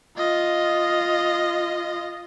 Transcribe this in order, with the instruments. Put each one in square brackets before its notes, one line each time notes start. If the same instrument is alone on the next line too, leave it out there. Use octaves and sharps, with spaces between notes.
[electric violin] F4 D#5